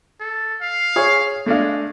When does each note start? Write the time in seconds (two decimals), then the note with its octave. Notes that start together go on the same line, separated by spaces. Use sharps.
0.20 A4
0.61 F5
0.96 G#4 C#5
1.46 G#3 A3 D4 F5